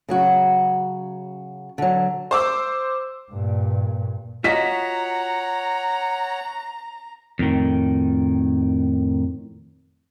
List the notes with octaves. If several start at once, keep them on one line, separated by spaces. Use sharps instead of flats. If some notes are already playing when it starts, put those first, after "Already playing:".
C#3 F#3 F#4
D3 F#3
C5 D6 E6
G2 A#2
F4 F#4 C#5 D#5 F#5 A#5 B6
F2 A2 D#3